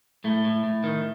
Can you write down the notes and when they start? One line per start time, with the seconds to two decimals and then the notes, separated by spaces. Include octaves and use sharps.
0.24 A2 A3
0.44 A2
0.64 A2
0.84 D#3